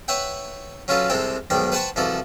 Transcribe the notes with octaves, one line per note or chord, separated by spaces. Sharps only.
B4 C#5 E5 F#5 G5
F#3 C#4 F4 A4 B4
C2 C3 G#3 C4 A4 G5
B1 G#2 D#3 G3 D5 G5
B4 C5 F#5 G5 A5 C#6
C2 E3 F3 F#4 A4 D5